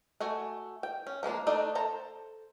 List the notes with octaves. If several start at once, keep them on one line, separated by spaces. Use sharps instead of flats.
A3 F#4 G#5
G5
C#4
F3 G#3 A#3 D4
A3 D4 D#4 D5 D#5
A4 C5 A#5